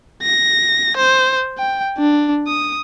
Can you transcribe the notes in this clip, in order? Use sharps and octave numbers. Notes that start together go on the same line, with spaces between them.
A#6
C5
G5
D4
D#6